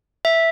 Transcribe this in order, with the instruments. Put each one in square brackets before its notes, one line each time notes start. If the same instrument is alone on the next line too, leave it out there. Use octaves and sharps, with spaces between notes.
[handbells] E5